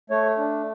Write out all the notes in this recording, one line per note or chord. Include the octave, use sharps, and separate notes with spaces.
A3 C#5
D4